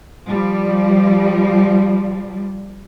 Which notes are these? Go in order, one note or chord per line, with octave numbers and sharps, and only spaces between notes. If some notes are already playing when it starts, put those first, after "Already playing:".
F3 G3